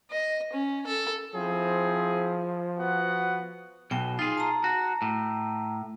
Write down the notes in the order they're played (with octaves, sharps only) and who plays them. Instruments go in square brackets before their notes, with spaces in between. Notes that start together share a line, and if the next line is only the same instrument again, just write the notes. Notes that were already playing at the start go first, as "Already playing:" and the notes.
[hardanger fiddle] D#5
C#4
A4
[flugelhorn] F3 [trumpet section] C4 E4 G#4
[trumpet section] B3 F#4 F#5
[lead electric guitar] B1 B2 [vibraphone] G5
[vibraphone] D#4 [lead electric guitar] F4 G#4
[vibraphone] A5 A#5
[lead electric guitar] F#4
A2